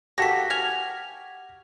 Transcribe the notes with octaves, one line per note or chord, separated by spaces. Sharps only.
A#3 F#4 G4 A4 A#6 B6
G#5 F6 F7